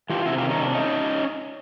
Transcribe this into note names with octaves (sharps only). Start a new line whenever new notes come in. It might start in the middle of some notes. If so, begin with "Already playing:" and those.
E3 F4 G4
C3 E4 F#4
D#3 F4 G4
C#4 D#4
C3 D4
A3 C#4 D#4